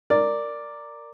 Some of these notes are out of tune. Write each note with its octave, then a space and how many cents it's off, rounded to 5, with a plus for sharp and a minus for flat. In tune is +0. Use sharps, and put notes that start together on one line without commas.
A#4 -10 D5 +0